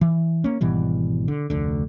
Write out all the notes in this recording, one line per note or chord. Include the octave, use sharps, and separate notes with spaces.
E3
A#3 C#4
G#1 B2 E3 G3
D3
F1 D2 D3